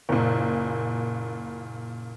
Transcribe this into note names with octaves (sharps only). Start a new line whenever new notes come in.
F#1 A#2